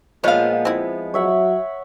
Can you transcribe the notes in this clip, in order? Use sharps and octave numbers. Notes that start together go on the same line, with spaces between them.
A#2 F3 G#3 B3 C#5 F5
C4 E4
F#3 C#5 E5 F#5